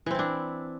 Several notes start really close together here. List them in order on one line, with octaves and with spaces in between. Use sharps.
E3 C4 E4 D4